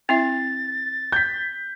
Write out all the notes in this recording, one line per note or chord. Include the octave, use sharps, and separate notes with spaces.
C4 E4 E5 A6
G6 B6